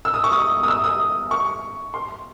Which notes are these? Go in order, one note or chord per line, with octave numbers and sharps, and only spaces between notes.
E6
D#6
C#6
D#6
D#6
E6
D#6
C#6
C6